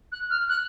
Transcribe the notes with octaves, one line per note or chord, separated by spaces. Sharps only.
F#6
F6
F#6